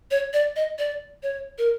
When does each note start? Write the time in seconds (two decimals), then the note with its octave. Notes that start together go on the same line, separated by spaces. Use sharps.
0.11 C#5
0.33 D5
0.56 D#5
0.79 D5
1.23 C#5
1.58 A#4